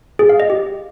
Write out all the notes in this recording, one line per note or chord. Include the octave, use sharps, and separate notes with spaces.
G#4
F5
D#5
G4